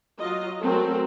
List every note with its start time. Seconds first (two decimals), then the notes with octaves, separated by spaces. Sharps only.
0.19 F#3 F4 D#5
0.62 F#3 G#3 A3 C4 A4 A#4